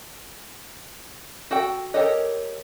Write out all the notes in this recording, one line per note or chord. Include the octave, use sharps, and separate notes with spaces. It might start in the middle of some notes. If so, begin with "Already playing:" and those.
F#4 A4 G5
G4 A4 A#4 C#5 D#5